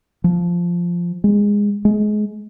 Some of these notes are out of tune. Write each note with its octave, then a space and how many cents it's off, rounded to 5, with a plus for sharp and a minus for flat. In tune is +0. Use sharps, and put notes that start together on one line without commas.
F3 -5
G#3 -15
G#3 +25